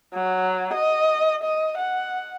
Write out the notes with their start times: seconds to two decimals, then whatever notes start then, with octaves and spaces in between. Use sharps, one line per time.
0.14 F#3
0.74 D#5
1.44 D#5
1.78 F#5